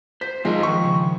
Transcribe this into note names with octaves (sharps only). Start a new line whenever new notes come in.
C5 B6
F3 G#3 D#4 F4 A#4 C5
D#3 C#6
C#3